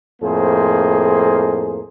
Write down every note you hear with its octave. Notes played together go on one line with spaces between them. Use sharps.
F2 A2 A#3 G#4 C5